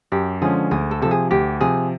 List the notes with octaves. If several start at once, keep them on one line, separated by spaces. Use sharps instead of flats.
F#2 G4
D3 F3 G#3 C#4 G#4
D2 G#4
A4
C3 F3 A4
G#4
D2 G4
C3 F3 G#4